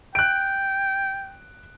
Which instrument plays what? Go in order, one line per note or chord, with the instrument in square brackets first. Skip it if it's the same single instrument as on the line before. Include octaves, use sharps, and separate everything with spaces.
[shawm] G5 [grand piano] F#6 D7